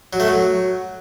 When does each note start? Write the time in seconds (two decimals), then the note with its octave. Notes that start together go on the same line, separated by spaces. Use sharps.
0.13 F#3
0.20 A3
0.27 F#3